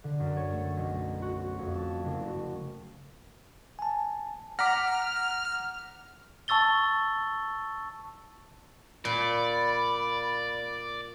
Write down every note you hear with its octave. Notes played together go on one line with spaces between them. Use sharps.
D3
F#2
C#5
A3
B1
F#4
F2
A5
F#1
F#4
G#5 A5
F#5 A#5 D6 F6 A#6 B6
A5 C#6 E6 A6 G7
A#2 D5 B5